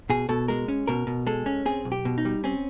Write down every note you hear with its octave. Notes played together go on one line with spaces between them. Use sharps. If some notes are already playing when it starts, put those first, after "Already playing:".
B2 G#4
B2 A4
G#3 A#4
C#4
B2 A#4
B2
G#3 A4
C#4
C4 G#4
B1
G4
B2
D#4
G3
C4 C#4